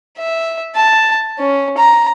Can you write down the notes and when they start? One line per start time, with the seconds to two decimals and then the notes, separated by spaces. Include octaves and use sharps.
0.18 E5
0.76 A5
1.39 C#4
1.78 A#5